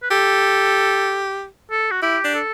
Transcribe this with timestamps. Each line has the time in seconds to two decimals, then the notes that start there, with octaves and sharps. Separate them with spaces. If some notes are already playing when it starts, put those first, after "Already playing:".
0.03 B4
0.11 G4 A4
1.71 A4
1.91 F#4
2.02 E4 G4
2.24 D4
2.35 A4